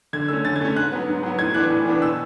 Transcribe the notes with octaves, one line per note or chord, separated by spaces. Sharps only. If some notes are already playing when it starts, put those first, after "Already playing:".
D3 G#6
A3 C#4 E6
D3 A6
G#6
A3 C#4
G#2 F#6
F#3 B3
G#2
F#3 B3
A2 G#6
E3 B3 D4 F#6
A2
E3 B3 D4
B2 E6